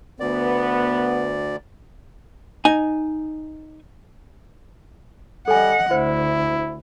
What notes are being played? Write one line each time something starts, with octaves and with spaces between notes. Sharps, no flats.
D2 B3 D5
D#4 G#5
G3 A4 D#5 F#5 G#5
D2 E4 C5